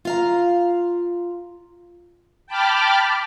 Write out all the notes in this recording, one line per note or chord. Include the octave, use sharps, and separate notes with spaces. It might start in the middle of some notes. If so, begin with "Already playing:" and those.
F4 F5 A#5
G5 A5 B5 D6 F6